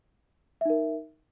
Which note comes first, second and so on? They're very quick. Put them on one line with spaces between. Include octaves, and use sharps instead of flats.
E5 D#4 A#4